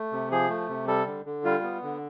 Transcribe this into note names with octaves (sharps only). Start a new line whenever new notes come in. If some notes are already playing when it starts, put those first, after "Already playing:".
Already playing: A3
C3
F3 G#4
A3
C3
G3 A4
D3
D3
G3 F4
B3
D3